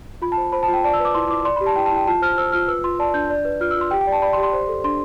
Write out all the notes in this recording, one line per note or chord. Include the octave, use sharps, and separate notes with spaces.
F4 B5
A5
C5
C5 B5
A5
F4 G5
D5 A5
E6
B4
D6
E4 C6
E4 D6
D5 C6
B5
G4
A5
E4 G5
A5
E4 G5
F4 A5
C5 F6
C5 E6
F4 F6
B4 E6
F4 C6
D5 A5
D4 G6
D5
B4
F4 F6
E6
F4 C6
G4 G5
G5
D5
A5
D5 B5
C6
G4
C6
C5
A4
D4 C6